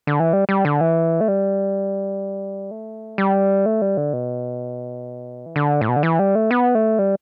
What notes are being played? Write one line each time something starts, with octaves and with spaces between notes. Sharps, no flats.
D3
E3
G3
G3
D3
E3
A3
G3
A3
G3
A3
G3
D3
B2
E3
D3
A2
B2
D3
E3
G3
A3
B3
A3
G3